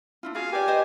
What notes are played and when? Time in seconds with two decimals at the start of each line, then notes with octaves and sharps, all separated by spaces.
0.23 D4 E4 F4
0.35 F4 F#4 G#4 F5
0.52 G4 B4 D5 G#5
0.67 B4 C5 D#5